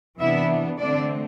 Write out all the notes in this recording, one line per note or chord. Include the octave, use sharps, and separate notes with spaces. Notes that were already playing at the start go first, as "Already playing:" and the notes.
C3 E3 B3 D4 E4 E5
D3 A3 C4 D4 D5